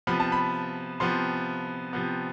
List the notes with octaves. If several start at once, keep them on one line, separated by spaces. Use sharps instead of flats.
C3 F3 B3 B5
A5
B5
C3 F3 B3 C6
C3 F3 B3